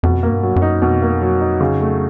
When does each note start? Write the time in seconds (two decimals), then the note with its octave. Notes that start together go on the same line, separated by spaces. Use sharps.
0.03 F2 B2
0.23 A#3
0.29 G2
0.43 F#3
0.56 F#2
0.62 D#4
0.82 F2 B2
1.02 A#3
1.22 F#3
1.41 D#4
1.61 C#3
1.80 A3